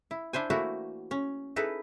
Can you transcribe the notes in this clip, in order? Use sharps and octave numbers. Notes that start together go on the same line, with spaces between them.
E4
D4 E4 C5 G#5
E3 A3 A#3 E4 F#4
C#4
D#4 E4 G#4 A4 B4